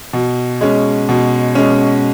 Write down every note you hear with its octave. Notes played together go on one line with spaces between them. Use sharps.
B2
G#3 C#4
B2
G#3 C#4